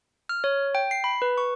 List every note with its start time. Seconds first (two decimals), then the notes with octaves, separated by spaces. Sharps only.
0.29 F6
0.44 C#5
0.75 G5
0.91 C7
1.04 B5
1.22 B4
1.38 C#6